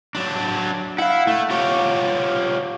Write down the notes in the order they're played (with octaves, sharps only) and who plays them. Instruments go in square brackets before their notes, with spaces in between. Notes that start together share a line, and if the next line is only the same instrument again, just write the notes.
[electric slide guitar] F#3 D4
[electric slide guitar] E4 [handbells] F5 F#5
[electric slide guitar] A3
F4 G4 C#5